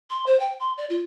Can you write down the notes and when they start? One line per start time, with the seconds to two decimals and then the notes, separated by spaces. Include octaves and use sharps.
0.10 C6
0.26 C5
0.40 G5
0.60 C6
0.78 D5
0.90 F4